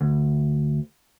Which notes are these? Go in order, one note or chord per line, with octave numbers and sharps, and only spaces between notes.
D2